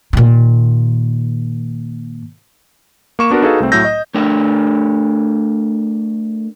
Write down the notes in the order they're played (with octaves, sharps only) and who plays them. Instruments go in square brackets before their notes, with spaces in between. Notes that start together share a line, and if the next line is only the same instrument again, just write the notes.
[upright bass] A#2 D#3
[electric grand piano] A#3 C#6 E7
B3 D4 F#4 A#4
D#4 F#4 G#4 A4 B4 F5
C2 A3 C4
A2 F#3 A3 E6 G6 A#6
D#5
[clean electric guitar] A3 D4 A#4 G5